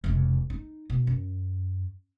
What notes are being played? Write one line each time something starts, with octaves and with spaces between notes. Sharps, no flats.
F1 C#2
D#4
B2
F#2